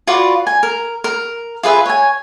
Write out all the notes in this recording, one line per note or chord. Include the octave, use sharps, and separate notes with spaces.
F4 F#4 B4 D5
G#5
A#4
A#4
F4 G#4 B4 E5
C#5 G#5